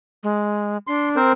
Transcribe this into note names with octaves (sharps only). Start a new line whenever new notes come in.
G#3
D4 C6
C4 A#4 C5